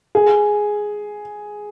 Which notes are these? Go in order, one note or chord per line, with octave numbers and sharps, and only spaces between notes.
G#4